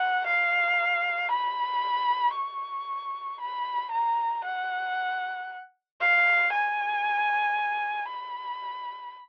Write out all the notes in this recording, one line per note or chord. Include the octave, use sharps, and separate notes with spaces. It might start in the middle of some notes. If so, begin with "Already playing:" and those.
Already playing: F#5
F5
B5
C#6
B5
A#5
F#5
F5
G#5
B5